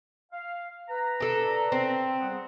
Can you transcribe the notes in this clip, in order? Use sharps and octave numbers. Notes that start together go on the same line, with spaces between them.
F5
B4 A#5
D4 A4
C4
G3 G#4 F#5